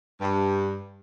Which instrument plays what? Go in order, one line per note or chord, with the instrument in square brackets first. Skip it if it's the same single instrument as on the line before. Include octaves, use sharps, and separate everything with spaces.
[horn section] G2